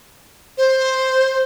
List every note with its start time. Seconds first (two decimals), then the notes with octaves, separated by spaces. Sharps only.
0.58 C5